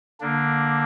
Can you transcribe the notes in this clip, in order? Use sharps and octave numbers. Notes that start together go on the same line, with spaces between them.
D3 A#3 D4